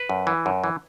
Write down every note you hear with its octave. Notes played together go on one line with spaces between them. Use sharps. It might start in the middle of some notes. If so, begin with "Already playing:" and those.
Already playing: B4
F#2
E3
F#2
E3